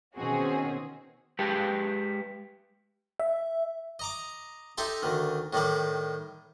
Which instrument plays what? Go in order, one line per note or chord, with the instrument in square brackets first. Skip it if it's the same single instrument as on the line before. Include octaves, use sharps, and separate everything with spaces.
[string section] B2 D#3 C4 C#4 F#4 G#4
[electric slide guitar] G#3 G4 B4 G5 A5
[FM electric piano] E5
[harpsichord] D#5 A#5 D6
D#4 G4 A4 E5 C6
D2 D#3
A2 D#3 G3 D5